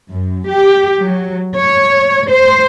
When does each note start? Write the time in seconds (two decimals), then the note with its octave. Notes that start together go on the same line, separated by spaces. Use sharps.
0.10 F#2
0.48 G4
1.03 F#3
1.57 C#5
2.30 C5